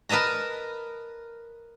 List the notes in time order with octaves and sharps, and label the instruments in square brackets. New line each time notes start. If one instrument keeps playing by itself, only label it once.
[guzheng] A#4 B4 D#5 A5 A#5